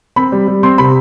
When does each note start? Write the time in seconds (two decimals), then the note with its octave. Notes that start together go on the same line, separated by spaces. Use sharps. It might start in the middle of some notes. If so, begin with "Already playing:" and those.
0.16 C4 B5
0.32 G3
0.48 G3
0.63 C4 C6
0.78 C3 B5